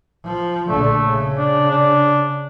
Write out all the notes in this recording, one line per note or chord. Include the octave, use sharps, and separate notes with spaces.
F3
A#1 D3 A3
C#3
D4
D4